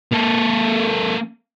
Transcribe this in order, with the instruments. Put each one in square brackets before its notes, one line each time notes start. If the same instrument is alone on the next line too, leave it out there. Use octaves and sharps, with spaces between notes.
[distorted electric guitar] A#3 A4